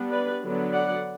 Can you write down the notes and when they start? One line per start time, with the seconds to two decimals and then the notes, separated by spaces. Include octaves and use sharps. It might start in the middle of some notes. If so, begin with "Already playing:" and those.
Already playing: G3 B3 D4
0.10 B4 D5
0.41 D3 F#3 B3 D4
0.72 D5 F#5